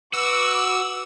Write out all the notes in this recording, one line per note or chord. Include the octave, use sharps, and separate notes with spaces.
F#4 B4 D6 E6